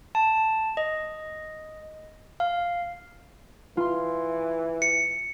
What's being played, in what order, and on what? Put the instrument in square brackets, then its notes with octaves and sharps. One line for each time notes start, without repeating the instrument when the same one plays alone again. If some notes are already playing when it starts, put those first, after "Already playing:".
[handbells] A5
D#5
F5
[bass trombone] E3 [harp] F4 C6
[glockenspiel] C#7